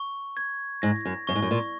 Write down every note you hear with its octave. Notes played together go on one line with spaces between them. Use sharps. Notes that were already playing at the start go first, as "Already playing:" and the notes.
Already playing: C#6
G#6
G#2 A#6
F#2
F#2 C#6
G#2
F#2
A#2